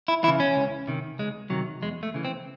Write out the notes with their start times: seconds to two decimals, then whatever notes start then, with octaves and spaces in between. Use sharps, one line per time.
0.08 E4
0.23 E3 E4
0.28 C#3
0.40 C#4
0.56 C#2
0.88 C3 D#3
1.19 C#2 G#3
1.50 C3 D#3 F#3
1.82 E2 G#3
2.03 A3
2.14 C#3 E3
2.25 C4